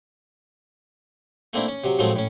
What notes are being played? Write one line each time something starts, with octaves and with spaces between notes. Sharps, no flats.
A3 A#3 C4 D4 E4
C#4
C3 F#3
A2 F3 F#3 G#3 A3 C4
A2 C#4